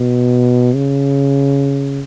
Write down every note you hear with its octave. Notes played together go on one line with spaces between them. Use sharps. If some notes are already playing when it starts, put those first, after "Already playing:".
Already playing: B2
C#3